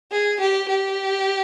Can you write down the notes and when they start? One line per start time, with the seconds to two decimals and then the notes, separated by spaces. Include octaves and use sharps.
0.12 G#4
0.41 G4
0.69 G4